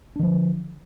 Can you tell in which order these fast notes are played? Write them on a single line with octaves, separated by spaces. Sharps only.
D4 D#3 F3 D3